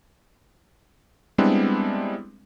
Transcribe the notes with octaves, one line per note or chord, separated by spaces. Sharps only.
G3 G#3 B3 C4 D4 E4